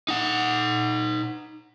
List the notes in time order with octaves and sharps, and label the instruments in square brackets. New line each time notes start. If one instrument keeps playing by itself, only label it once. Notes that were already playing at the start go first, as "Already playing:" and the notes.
[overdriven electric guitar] D#4 F#5